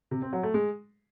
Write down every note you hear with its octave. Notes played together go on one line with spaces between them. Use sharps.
C3
C4
F#3
A3
G#3